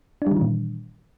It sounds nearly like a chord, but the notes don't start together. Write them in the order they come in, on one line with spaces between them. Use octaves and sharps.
D4 G3 D#3 E3 A#2